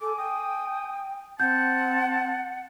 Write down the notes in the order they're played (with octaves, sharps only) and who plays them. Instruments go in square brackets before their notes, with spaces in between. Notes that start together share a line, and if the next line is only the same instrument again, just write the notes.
[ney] A4 [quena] G#5 [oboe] D6
[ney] G5 [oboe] D#6
[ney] C4 [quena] F#5 [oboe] A5 [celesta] G6